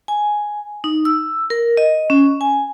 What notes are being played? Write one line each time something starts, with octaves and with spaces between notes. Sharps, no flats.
G#5
D#4
E6
A#4
D#5
C#4
G#5